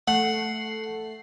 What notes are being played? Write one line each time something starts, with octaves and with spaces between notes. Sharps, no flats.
A3 F#5 C7